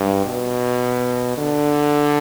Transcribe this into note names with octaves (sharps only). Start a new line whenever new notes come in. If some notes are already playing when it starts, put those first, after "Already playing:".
Already playing: G2
B2
D3